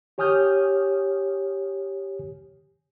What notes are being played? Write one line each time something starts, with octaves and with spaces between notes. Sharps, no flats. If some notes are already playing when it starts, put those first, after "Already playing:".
G4 C#5 G#5 D#6 F6 G6